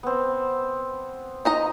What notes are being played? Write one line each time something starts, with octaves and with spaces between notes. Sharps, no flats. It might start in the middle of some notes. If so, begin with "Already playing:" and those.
B3 C4
D#4 D#5 A#5